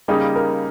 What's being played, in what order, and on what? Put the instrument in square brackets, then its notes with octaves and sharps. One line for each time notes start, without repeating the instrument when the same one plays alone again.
[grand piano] C#3 G3 A#3 D#4 [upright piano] G#4
[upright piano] A#4